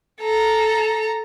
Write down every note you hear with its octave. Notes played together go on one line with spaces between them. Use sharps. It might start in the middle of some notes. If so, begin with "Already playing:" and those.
A4 A#5